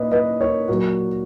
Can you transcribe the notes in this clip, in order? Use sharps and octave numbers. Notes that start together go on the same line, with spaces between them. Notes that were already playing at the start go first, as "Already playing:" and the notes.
Already playing: A#2 B4 D#5
B4 D#5
A#4 C#5
A#2 F#3 F#4 A#4